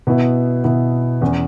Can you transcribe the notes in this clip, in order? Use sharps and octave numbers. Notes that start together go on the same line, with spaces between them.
B2 B3 E4
B2 B3 E4
E2 E3 C#4